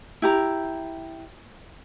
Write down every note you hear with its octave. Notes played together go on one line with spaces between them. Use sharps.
E4 G4 A#5